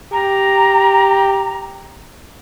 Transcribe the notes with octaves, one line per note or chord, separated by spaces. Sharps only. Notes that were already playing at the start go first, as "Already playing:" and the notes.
G4 A#5